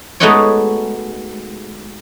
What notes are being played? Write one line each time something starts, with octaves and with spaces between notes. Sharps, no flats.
G#3 A3 B3 D#4 F#4 C#5